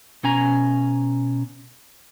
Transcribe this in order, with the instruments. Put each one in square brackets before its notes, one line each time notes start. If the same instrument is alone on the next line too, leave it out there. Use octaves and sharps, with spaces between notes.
[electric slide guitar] B2 C#4 G#5 A#5